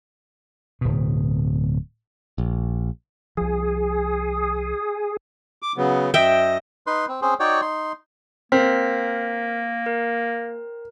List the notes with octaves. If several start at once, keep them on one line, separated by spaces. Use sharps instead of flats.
D1 B2
A#1
C2 F3 G#4
D6
C#3 F#3 B3
F#2 D#5 E5 G5
D#4 B4 C6
C4
C4 C#4 G#4 C5
D#4 F#4 C#5 D5 G5
D#4 C6
A#3 C4 A#4 F6 B6
A#4